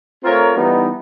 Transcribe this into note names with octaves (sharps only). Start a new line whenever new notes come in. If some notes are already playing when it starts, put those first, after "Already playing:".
A3 C4 F4 A#4 C#5
E3 G3 B3 D#4